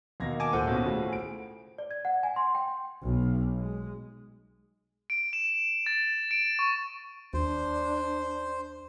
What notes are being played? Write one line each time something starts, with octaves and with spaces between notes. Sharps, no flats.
D#2 B2 A#3 F5 G#6 A#6
G#5 A5 D6
D1 F4 A4 C5 F#5 G6 D#7
D#2 B2 C#4
A2 C#3 F4 F#4
G#5 D7
D5
G#6
F#5
G#5
C6
G5
B1
G#3
D7
E7
A6
D7
C#6
D#2 D4 C5